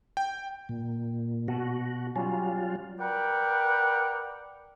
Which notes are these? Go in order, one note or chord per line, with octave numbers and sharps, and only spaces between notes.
G5
A#2
B2 F#4
F#3 G3 C#4 F4
A#4 B4 D5 F#5 G5